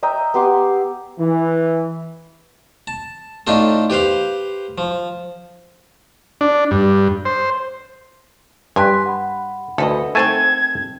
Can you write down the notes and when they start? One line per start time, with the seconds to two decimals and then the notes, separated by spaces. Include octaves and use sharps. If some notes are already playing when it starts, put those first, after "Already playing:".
0.03 D#5 E5 G5 A#5
0.34 B3 G4 C6 D6
1.18 E3
2.87 A5
3.47 A2 D4 D#4 F4 A4
3.90 G4 B4 C5 F5
4.78 F3
6.41 D4
6.71 G2
7.25 C5
8.76 G2 G4 G#5 C6 F#6 B6
9.06 F#5 B5
9.78 D2 A4 B4 D#5
10.15 D#3 A3 C4 A4 G#5 A5 G#6